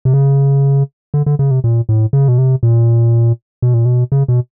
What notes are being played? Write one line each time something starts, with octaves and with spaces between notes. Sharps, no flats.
C3
C#3
D3
D3
C#3
C3
A#2
A2
C#3
B2
C3
A#2
B2
A#2
B2
C#3
B2